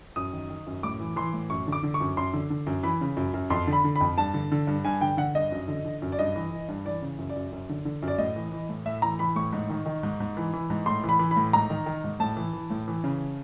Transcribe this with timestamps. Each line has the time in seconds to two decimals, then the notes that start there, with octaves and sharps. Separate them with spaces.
0.16 F#2 D#6
0.33 D#3
0.50 D#3
0.67 F#2
0.83 A2 D6
1.00 E3
1.16 E3 C6
1.33 A2
1.50 F#2 C#6
1.67 D3
1.72 D6
1.83 D3
1.94 C#6
2.00 F#2
2.17 F#2 C6
2.33 D3
2.50 D3
2.67 F#2
2.83 E3 B5
3.01 C#3
3.17 F#2
3.34 F#2
3.50 F2 C6
3.67 D3
3.73 B5
3.84 D3
3.96 B5
4.01 F2
4.18 G2 A5
4.34 D3
4.52 D3
4.67 G2
4.85 G2 G#5
5.01 D3 G5
5.17 D3 F#5
5.35 G2 D#5
5.51 F#2
5.68 D3
5.85 D3
6.02 F#2
6.12 D5
6.19 G2 D#5
6.36 E3
6.51 E3
6.68 G2
6.85 E3 D5
7.02 C#3
7.18 F#2
7.29 D5
7.36 F#2
7.52 F#2
7.69 D3
7.85 D3
8.02 F#2
8.08 D5
8.18 A2 D#5
8.36 E3
8.52 E3
8.69 A2
8.86 A2 E5
9.02 E3 A#5
9.19 E3 B5
9.36 A2 C#6
9.52 G#2
9.70 D#3
9.86 D#3
10.03 G#2
10.20 G#2
10.37 E3
10.53 E3
10.70 G#2
10.86 A2 C6
11.04 E3
11.09 B5
11.19 E3
11.31 B5
11.37 A2
11.53 G#2 A#5
11.70 D#3
11.86 D#3
12.04 G#2
12.20 A2 A5
12.37 E3
12.53 E3
12.70 A2
12.88 E3
13.04 C#3